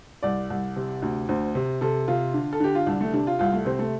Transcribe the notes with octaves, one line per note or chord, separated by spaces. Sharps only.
C2 D5
C2
C3
D2
D2 C5
C3
C3 A4
C3 F4
D3
A4
D3 G4
F4
C2 D4
A3
C3 D4
F4
C2 F4
A3
C3 C4
A3